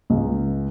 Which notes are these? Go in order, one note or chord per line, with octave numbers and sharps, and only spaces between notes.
C#2